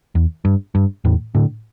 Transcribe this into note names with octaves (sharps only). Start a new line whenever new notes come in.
E2
G2
G2
E2 A2
A2 D3